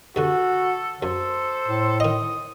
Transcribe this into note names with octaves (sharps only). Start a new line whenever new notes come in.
G2 D3 F#4 A4
F#2 A4 C5
A2
D#3 D#5 D#6